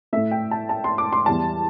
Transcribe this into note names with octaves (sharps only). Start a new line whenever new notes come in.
A2 A3 E5
G5
A5
A5
C6
D6
C6
E2 E3 G3 A5